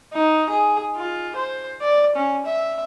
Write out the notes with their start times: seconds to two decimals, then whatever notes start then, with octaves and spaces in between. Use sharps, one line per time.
0.13 D#4
0.50 G#4
0.96 F4
1.36 C5
1.82 D5
2.16 C#4
2.46 E5